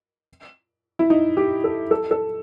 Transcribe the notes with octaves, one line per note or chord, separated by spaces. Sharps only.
E4
D#4
G4
A4
A4
A4